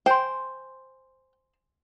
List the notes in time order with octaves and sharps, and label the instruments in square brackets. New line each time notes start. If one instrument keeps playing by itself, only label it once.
[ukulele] C5 [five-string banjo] G5 [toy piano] G#5 C6